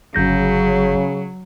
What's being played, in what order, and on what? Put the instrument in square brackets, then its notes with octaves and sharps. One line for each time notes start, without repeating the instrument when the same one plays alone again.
[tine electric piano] G1 G6 A#6 [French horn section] C#3 [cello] F#3